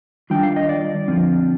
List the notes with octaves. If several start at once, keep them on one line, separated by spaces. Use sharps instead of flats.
D#3 G3 D4 F4 G5
F5
D#5
D5
D3 F3 C4 F4